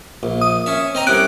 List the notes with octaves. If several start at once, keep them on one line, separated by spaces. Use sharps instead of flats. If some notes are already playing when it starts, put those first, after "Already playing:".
A#1
D#6
C#4 E5
C4 D#5 A#5
C2 C3 C#4 F#6 D7